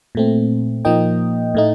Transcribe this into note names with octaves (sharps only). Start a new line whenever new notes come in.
A#2 A3 C4
A#2 F3 A#3 D#4 D#5 G5
A2 A3 D#4